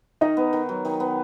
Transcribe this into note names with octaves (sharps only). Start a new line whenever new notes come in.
D#3 D#4 D#5
B3
D#3
F#3
D#3
B3